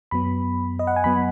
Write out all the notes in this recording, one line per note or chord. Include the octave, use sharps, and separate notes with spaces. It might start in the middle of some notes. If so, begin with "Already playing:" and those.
F#2 F#3 B3 B5
D#5
F#5
G#5
F#2 F#3 B3 B5